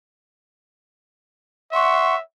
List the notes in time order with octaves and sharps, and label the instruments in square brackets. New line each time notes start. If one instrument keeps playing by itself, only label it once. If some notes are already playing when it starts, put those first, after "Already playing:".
[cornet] E5 [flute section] F#5 C6 C#6